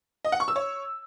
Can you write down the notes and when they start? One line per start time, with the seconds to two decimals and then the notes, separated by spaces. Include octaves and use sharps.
0.25 D#5
0.32 F#5
0.40 C#6
0.48 E6
0.56 C#5